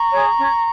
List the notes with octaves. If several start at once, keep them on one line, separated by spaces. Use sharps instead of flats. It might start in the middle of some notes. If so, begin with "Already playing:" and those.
Already playing: A#5 C#6
G#4 C#5
C#4